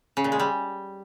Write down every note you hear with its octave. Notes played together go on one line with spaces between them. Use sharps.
C#3
A#2
G#3
G3